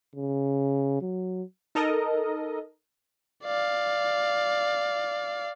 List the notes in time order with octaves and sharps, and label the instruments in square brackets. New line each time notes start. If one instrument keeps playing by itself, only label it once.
[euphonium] C#3
F#3
[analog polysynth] D#4 A4 A#4 D#5
[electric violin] D5 F5